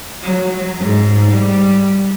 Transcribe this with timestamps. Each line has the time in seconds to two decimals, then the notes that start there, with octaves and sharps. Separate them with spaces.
0.23 F#3
0.79 G#2
1.32 G3